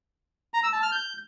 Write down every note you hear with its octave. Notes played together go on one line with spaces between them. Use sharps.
A#5
E6
A5
F6
G6